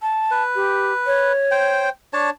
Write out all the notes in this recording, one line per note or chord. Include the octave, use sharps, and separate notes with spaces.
A5
B4
G4
C#5
C5 G5
D4 C#5 A5